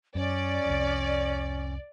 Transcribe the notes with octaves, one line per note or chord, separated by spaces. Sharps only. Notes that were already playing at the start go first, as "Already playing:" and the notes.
F#2 C#4 D5
C2 F2